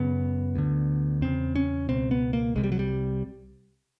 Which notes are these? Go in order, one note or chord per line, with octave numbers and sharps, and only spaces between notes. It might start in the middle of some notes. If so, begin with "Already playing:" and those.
Already playing: F#2 C#3 B3
D2 D3
E2 C#3 C4
C#4
C#2 B2 C4
B3
A#3
C2 C3 G#3
G3
F#3
G3